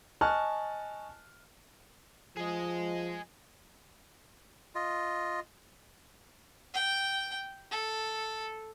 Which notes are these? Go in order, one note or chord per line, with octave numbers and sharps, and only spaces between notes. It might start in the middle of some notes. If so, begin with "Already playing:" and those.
D#5 G#5 A5 C#6 F6 F#6
F3 G#4 D#5
F4 D#5
G5
A4